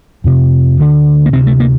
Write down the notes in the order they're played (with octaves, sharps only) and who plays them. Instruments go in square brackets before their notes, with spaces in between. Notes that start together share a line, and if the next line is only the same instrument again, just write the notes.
[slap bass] F2 C3
D2 D3
A#3
D2 C3 C4
A3
A#3